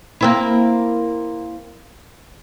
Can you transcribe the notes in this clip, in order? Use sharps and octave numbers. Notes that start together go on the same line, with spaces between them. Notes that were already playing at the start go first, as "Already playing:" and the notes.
A#3 C4 E4